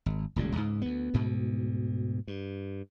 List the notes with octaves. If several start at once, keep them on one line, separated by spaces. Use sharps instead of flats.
G#1
D#1 C#2 A2 G3
C#2 G#2
D2 B3
D2 G#2 B2
G2